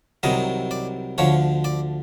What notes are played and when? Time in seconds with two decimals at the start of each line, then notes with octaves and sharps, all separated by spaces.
0.23 C2 C3 D#3 F#3 D#5
0.71 D5
1.18 D2 D3 F3 C#5
1.64 D5